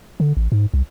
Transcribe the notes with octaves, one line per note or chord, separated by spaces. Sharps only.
D3
A1
G#2
C2